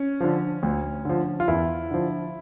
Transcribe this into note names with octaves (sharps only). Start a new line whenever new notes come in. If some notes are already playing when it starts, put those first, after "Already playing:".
Already playing: C#4
D3 F3
D2
D3 F3
F4
E2 E4
D3 F3